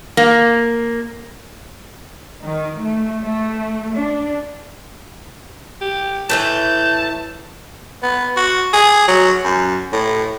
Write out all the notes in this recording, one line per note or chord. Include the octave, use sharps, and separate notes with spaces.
A#3
D#3
A3
A3
D4
G4
A2 E3 A3 A5 G6
B3
F#4
G#4
F#3
F#2
A2